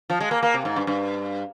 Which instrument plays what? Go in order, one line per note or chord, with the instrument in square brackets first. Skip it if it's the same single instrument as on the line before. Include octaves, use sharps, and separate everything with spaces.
[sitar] F3
G#3
A#3
A#3
C3
G#2
G2
G2